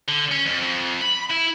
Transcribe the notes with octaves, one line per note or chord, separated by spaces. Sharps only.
D3
C#4
F2
F2
B5
E4